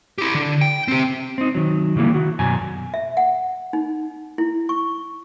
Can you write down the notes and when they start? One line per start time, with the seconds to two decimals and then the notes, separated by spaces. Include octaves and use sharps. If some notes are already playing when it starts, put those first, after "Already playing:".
0.18 E4 G4
0.34 D3
0.61 G5
0.88 C4 G4
1.38 C4 D#4
1.55 D#3 F#3
1.96 C#3 E3 G3 A#3 E4
2.10 D#3 F#4
2.39 F#2 B2 G#5 A#5
2.94 E5
3.17 F#5
3.73 D#4
4.38 E4
4.69 C#6